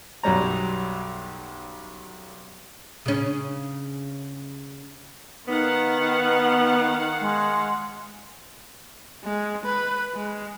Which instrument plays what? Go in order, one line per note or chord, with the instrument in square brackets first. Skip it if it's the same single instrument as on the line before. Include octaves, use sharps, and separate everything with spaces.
[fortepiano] B1 F#2 F#3 G3 C#5 A#5
[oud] C#3 C#4
[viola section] D#3 F5 F#5 [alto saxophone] B3 [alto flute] D#4
[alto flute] G#3
[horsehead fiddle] G#3
B4
G#3